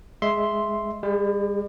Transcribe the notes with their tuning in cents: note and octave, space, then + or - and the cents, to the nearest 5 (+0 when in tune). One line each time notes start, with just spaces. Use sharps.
G#3 +0 E5 +0 C6 +0
G3 +40 G#4 +0